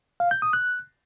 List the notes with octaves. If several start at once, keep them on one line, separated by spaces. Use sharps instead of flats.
F5
G6
D#6
F#6